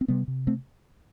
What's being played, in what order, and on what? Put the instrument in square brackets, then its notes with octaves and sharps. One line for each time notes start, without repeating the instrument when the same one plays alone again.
[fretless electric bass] C4
C3 G3 B3
C3
A3 C4